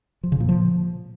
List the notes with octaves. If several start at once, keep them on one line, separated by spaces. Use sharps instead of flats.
F3
C#3
A#2
F3